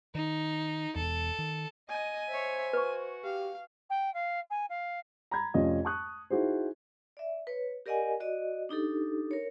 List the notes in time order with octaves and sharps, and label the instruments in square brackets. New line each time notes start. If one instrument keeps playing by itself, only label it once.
[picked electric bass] D#3 [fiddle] D#4
[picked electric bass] E1 E2 [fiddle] A4
[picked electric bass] D#3
[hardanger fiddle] D#5 [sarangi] G#5
[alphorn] C5 [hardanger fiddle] C#5 E5
[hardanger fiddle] F#4 [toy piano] B4 C#6
[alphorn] G4 [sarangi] F5
[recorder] G5
F5
G#5
F5
[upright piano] A#5 B5 G#6
F1 F2 C#4 F4 D#5
A5 C#6 D#6 F#6
D#4 E4 F#4 G#4 C5
[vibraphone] D5 E5
B4 C#5
G4 A#4 D5 D#5 F#5 G#5
F#4 D5 D#5
D4 D#4 G4 A4
A#4 C#5